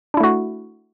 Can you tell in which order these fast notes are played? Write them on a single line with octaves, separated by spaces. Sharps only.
D4 E4 A3 F#4